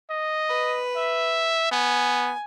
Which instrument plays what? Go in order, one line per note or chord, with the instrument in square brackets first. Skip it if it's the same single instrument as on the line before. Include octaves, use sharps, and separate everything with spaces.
[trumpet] D#5
[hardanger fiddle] B4
[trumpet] E5
[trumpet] B3 [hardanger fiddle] G#5